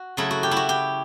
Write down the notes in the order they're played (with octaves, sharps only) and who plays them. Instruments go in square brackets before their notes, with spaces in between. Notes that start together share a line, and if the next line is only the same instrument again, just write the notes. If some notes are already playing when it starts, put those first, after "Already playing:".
Already playing: [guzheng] F#4
C#3 F#3 A3 E4
F#4
G4
E4
F#4
G4